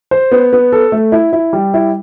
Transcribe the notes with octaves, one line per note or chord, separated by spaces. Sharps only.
C5
B3
B3
A4
A3
E4
E4
G3
E4